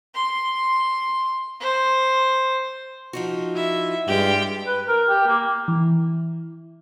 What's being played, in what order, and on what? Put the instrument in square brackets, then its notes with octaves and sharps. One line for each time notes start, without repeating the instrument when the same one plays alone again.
[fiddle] C6
C5
[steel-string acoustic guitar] F3 D#4 F#4
[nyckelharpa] E4 E5
[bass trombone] G2 [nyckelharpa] G#3 F4 [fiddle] G4
[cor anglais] B4
A#4
G4
A#3
[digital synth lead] E3